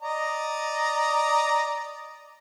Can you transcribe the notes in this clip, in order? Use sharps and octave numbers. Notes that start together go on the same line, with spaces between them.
D5 D#5 A#5